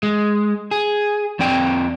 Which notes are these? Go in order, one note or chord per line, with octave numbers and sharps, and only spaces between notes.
G#3
G#4
F2 C4 D5 G5